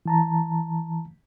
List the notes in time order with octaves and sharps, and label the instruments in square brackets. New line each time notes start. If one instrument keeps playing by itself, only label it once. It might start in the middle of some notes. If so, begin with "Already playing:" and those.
[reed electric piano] E3 A5 A#5